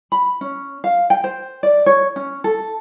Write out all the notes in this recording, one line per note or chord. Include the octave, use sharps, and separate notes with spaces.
B5
C#4
F5
G5
C5
D5
C#5
C#4
A4